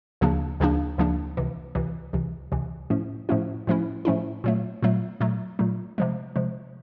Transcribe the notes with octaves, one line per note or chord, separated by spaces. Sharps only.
D2 C#3 F3 A#3 D4
D2 C#3 F3 A#3 D4
D2 C#3 F3 A#3 D4
C#2 C3 E3
C#2 C3 E3
C#2 C3 E3
C#2 C3 E3
A2 F3 A3 C#4 E4
A2 F3 A3 C#4 E4
A2 F3 A3 C#4 E4
A2 F3 A3 C#4 E4
A#2 F#3 A3
A#2 F#3 A3
A#2 F#3 A3
A#2 F#3 A3
C3 F3 G#3
C3 F3 G#3